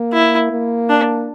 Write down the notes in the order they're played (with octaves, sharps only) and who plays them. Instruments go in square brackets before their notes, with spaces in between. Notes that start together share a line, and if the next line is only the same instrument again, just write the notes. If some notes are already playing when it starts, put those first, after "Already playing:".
Already playing: [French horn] A#3
[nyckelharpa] E4
[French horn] A#3
[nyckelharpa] D4